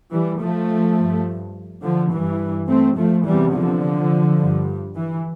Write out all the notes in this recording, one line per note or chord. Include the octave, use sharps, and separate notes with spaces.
E3 G3
F3 A3
G2
D3 F3
G2 E3
A3 C4
F3 A3
E2 C3 E3 G3
D3 F3
G2
E3